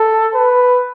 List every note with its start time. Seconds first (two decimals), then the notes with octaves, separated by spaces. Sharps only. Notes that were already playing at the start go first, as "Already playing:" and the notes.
Already playing: A4
0.34 B4